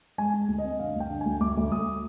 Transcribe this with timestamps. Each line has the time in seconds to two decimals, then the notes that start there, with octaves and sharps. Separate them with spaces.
0.18 G#3 G#5
0.34 G#3
0.48 D2
0.58 D#5
0.64 C4
0.79 D3 F5
0.96 D2 G5
1.10 D3
1.21 D2 G#5
1.41 D2 D6
1.57 D2
1.72 D2 D#6